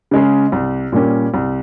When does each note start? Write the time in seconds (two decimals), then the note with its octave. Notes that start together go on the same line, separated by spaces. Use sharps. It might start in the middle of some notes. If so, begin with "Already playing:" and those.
0.11 C#3 G#3 C#4 G#4
0.52 C2
0.92 A#2 G3 A#3 C#4
1.34 C2